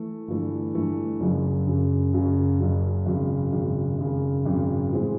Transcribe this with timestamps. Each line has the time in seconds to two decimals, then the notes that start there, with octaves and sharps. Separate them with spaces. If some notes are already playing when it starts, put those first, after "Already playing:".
Already playing: E3 A3
0.27 G1 G2 E3 A3
0.74 G1 G2 E3 A3
1.20 F#1 F#2 C#3 F#3
1.67 F#1 F#2 C#3 F#3
2.13 F#1 F#2 C#3 F#3
2.59 F#1 F#2 C#3 F#3
3.06 G#1 F#2 C#3
3.52 G#1 F#2 C#3
3.98 G#1 F#2 C#3
4.46 G#1 F#2 C#3
4.91 A2 E3 G#3 C4